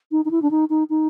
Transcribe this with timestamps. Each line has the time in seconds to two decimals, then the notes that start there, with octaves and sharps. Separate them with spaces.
0.12 D#4
0.25 D#4
0.31 E4
0.42 D4
0.51 D#4
0.70 D#4
0.90 D#4